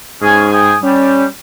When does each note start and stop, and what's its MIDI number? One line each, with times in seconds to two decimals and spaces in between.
0.22 0.75 44
0.22 0.51 61
0.22 0.51 68
0.22 0.51 80
0.52 0.76 79
0.52 0.76 80
0.52 0.76 87
0.83 1.23 55
0.83 1.25 61